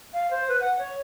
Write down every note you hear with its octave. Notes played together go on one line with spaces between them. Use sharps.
F5
C5
B4
F#5
C#5